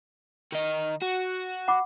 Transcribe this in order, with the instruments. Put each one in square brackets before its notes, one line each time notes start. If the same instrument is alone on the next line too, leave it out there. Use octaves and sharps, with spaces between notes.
[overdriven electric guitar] D#3 D#5
F#4
[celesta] F#5 B5 D6